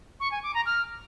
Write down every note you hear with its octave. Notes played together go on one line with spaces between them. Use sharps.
C#6
G#5
D6
A#5
F6